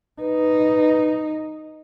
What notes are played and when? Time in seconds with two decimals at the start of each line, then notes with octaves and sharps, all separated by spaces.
0.21 D#4 B4